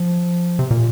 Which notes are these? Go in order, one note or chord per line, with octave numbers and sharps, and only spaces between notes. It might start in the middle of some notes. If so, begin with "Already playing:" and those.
Already playing: F3
C3
A#2